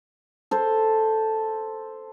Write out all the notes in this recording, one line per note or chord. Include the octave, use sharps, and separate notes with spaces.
A4 C5